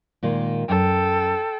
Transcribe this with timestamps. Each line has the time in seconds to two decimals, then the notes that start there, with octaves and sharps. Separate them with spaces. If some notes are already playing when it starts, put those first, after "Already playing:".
0.23 A#2 D#3 G#3
0.69 F#2 A4 G5